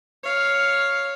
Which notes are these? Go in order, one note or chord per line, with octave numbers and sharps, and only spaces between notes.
C#5 F5